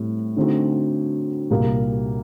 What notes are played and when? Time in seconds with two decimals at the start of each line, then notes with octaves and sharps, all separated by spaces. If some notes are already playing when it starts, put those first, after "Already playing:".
Already playing: A2 G3 C4
0.37 D3 A3 C4 D#4 F#4
1.50 C2 A#2 G3 A#3